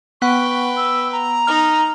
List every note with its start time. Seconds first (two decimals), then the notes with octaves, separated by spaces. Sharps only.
0.22 B3 B4 F#5 G5 C#6
0.77 E6
1.12 A#5
1.47 D#4 F6